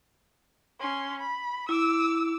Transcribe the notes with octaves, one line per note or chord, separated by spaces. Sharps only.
C#4 C6
B5
E4 D6 E6